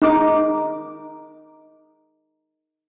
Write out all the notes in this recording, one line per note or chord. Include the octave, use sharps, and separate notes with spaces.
D#4 D6